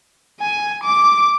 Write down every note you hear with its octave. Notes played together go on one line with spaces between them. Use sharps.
G#5
D6